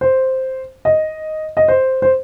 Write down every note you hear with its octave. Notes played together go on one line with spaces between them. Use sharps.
C5
D#5
D#5
C5
C5